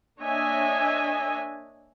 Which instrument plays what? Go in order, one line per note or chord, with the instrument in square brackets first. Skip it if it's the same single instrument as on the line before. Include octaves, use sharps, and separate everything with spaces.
[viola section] A#3 D4 C#5 D#5 E5 G#5